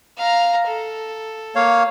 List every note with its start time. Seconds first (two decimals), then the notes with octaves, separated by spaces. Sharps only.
0.18 F5 A#5
0.67 A4
1.55 A#3 C#5 F5